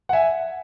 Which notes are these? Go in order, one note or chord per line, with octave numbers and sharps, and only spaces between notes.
F#5
E5 G#5